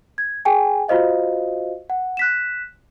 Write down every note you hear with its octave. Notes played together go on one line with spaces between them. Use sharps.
G#6
G#4 G5 G#5
F4 F#4 C5 D#5 F5
F#5
F#6 B6 E7